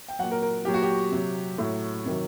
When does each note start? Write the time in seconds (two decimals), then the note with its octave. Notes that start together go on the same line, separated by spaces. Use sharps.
0.09 G5
0.19 F#3 F#5
0.23 A#2
0.31 A#4
0.42 A#4
0.65 A#2 F#3 G4
0.74 F#4
0.82 G4
1.12 C3 F#3
1.58 A2 F#3
2.05 C3 D#3 F#3